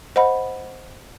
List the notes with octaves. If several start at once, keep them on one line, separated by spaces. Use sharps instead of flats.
C5 D#5 F#5 B5